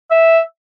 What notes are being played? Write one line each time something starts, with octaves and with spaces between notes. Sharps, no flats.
E5